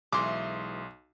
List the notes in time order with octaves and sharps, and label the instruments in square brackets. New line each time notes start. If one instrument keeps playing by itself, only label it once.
[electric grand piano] B1 C6 [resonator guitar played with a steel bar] E3 G#3 [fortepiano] D6